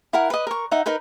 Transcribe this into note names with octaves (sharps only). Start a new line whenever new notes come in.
E4 A#4 F#5
B4 D#5
A#4 C#6
D#4 E5 F#5
D#4 A#4 B4 B5